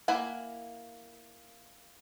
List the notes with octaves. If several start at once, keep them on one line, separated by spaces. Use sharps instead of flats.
A#3 E4 F#5 G#5